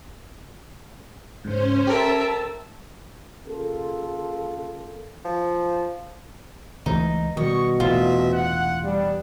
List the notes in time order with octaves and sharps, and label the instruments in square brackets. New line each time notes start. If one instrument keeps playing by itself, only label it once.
[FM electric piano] G#2 C#3 [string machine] C#4 C5
[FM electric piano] G4 A4 [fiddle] A#4 E5 [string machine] A5 E6
[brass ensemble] C#3 A#3 F4 A4
[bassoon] F3
[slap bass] C#2 E3 A3 [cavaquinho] D#4
[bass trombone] B2 [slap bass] D#3 G3 [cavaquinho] D#5 [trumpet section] C#6
[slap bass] E1 A2 C3 [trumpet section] C4 D#5 E5 [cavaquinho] F4
[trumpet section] F#5
[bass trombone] G3 [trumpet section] B3 D4